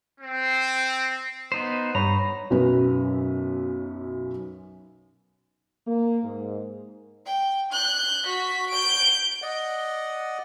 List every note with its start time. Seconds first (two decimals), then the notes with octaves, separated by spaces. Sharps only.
0.20 C4
1.52 B3 D#4 C5
1.95 G2 C#5 A#5 B5
2.50 B1 F#2 C#4 B4
5.87 A#3
6.23 G#2
7.26 G5
7.72 F#6 G6
8.25 F#4 B6
8.70 G6 D7
9.42 D5 D#5 F#5